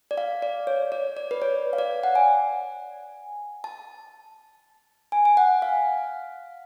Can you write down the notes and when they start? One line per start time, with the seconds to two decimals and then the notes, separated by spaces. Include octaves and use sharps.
0.11 D5
0.18 F5
0.42 D5
0.67 C#5
0.92 D5
1.17 D5
1.31 B4
1.42 C#5
1.73 F5
1.78 D5
2.03 F#5
2.15 G#5
3.64 A5
5.12 G#5
5.25 G#5
5.37 F#5
5.62 F5